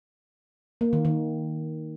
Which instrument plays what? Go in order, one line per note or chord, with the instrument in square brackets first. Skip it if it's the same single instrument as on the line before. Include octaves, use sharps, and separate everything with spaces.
[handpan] A#3
D#3
D#3